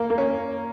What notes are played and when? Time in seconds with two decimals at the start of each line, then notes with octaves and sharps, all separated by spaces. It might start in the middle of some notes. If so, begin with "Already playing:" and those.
Already playing: A#3
0.10 A#3
0.18 C#4